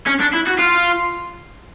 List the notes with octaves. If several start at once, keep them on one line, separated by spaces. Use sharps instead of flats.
C#4
D4
E4
F#4
F4